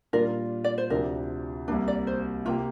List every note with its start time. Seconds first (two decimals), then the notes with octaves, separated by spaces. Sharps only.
0.13 A#2 G3 D4 F4 A#4
0.64 D5
0.78 C5
0.90 D2 C3 F3 D4 A#4
1.68 C2 C3 A#3 D4
1.88 D5
2.07 C5
2.45 C3 A#3 F4 G4